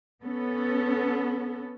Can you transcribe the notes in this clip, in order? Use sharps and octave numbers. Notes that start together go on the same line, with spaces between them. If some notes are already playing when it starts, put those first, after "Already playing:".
B3 C#4 A4